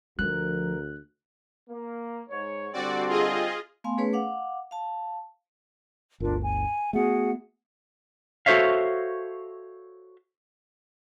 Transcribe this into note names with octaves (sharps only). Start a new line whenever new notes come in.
D2 F3 A#4 F#6
A#3
G#2 C#5
D3 G3 C4 F#4 D5
F4 G#4 D#5
A3 B3 F5 G#5 C6
A3 C#4 G#4 B4 C#5
F5 F#5 D6
F5 A5
G1 D2 D4 F4 A#4
G#5
A3 B3 F#4 G#4 F#5
F#4 A4 C5 C#5 E5 F5